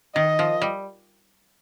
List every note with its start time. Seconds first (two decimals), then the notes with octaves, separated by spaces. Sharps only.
0.15 D#3 D#5
0.39 F3
0.62 G3